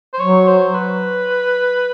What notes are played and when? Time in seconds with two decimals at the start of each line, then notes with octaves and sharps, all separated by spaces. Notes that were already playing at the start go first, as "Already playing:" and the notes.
0.14 C5
0.20 F#3 C#5
0.48 C5
0.75 B4